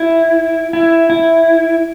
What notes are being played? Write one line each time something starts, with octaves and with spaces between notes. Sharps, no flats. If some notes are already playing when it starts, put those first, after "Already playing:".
Already playing: E4
E4
E4